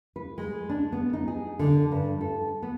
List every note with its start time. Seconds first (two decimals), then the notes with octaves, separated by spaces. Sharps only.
0.16 B4
0.38 G#3
0.69 D4
0.92 B3
1.13 D#4
1.28 G#4
1.59 D3
1.92 G2
2.21 A4
2.62 B3